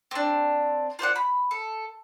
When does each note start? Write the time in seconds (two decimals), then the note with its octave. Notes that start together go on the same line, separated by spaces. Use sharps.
0.11 C4 D4
0.99 F4 C5 D5 F#5
1.16 B5
1.51 A4